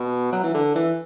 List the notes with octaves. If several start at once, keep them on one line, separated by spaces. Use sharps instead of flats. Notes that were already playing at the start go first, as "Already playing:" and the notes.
Already playing: B2
F#3
E3
D3
E3